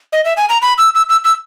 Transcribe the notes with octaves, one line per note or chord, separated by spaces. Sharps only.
D#5
E5
G#5
A#5
B5
E6
E6
E6
E6